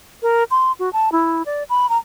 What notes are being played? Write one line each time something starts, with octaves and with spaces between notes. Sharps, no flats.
A#4
C6
F#4
A5
E4
D5
B5
A#5